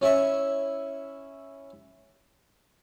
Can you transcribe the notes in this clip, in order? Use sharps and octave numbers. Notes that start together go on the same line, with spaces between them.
C#4 E4 E5 C#6